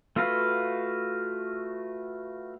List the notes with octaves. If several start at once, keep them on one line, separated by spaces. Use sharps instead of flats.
A3 F4 F#4 B4 F5